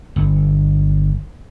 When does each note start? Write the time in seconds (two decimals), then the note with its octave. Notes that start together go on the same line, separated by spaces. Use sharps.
0.16 G1